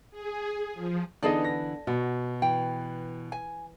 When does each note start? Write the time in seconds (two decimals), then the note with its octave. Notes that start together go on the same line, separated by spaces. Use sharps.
0.11 G#4
0.74 F3
1.23 D3 E3 B3 D#4 G#4 A4 D5 D#5
1.44 A#6
1.87 B2 F#4
2.42 E3 G5
3.32 G#5